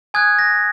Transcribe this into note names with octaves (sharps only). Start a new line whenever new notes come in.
G#5 D#6 F#6 G#6
A#6